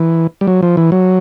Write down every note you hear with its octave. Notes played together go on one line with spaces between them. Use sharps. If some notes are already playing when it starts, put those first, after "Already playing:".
Already playing: E3
G3
F#3
F3
E3
F#3